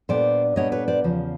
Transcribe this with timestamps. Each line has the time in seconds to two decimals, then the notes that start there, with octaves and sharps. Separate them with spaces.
0.09 A#2 G3 B3 D4 C5 D5
0.56 A#2 G3 B3 D4 C#5 D#5
0.72 B4 C#5
0.88 C5 D5
1.04 E2 C#3 F3